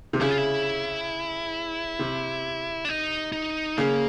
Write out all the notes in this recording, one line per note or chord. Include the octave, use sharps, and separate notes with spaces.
C3
C#3 E4
F4
E4
C3
D4
D#4
D#4
C#3 A#3